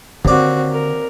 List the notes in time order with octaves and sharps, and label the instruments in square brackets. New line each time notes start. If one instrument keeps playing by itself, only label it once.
[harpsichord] D#2 D5 [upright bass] D3 [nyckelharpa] C4 F#4
[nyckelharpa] A#4